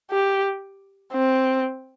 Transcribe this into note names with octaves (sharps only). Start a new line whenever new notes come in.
G4
C4